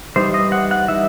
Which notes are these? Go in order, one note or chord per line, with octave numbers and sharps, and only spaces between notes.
E3 G3 D#4 C5
D#5
F#5
F#5
E3 G3 D#4 E5